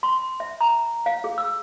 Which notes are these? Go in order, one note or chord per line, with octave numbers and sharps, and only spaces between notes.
C6
E5
A#5
F5
G#4
E6